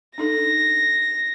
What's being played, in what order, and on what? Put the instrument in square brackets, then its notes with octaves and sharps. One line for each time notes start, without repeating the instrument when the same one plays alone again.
[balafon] D4 D#4 A4 [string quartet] A#6